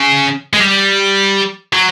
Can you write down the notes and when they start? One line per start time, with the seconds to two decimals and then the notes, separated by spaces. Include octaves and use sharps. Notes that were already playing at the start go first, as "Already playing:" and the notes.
Already playing: C#3
0.53 G#3
0.60 G3
1.73 F#3